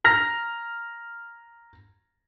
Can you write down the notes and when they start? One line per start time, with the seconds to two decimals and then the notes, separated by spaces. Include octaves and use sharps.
0.04 A#5 F6 A#6